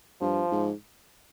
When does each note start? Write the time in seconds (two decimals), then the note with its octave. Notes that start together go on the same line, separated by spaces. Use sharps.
0.21 G2 F3
0.52 G#2